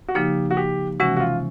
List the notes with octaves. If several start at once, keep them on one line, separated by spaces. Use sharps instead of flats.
F#4
C#3 F3 A#3 D#4 G4
F#4
G4
C3 E3 G#3 C#4 F#4
F#4
F4